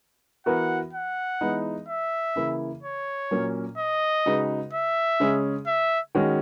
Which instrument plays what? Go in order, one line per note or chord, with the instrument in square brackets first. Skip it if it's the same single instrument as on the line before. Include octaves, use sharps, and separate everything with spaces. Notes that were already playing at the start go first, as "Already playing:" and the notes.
[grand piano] E3 B3 F#4 A#4 [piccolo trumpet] F#5
[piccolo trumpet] F#5
[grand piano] E3 G#3 B3 D#4
[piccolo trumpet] E5
[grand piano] C#3 E3 A#3 E4
[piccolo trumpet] C#5
[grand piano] A#2 F#3 A#3 C#4
[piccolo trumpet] D#5
[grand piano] C#3 G#3 D#4 F#4 B4
[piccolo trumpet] E5
[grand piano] C#3 G#3 C#4 G#4
[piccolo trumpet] E5
[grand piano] D#3 G#3 C#4 F#4